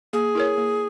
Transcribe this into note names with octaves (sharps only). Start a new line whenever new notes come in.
A#3 G#4
E4 A#4 C#5
A#3